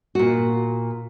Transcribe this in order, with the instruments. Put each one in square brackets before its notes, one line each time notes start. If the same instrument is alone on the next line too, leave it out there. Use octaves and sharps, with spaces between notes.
[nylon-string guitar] A#2 F#4